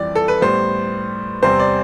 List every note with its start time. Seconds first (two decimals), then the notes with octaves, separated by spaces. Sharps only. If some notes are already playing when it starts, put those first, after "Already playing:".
Already playing: F2 E3 G3 C4 D5
0.15 A4
0.28 B4
0.41 A2 G3 B3 C5
1.42 E2 C3 G3 C4 C5
1.60 D5